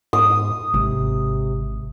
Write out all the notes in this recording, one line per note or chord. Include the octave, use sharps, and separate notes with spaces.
G#2 D#6
G#1 C3